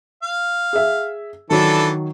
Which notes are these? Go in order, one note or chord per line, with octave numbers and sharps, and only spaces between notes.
F5
G#4 E5
D#3 E3 F#3 D4 A4